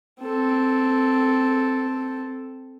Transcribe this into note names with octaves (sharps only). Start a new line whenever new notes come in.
C4 A4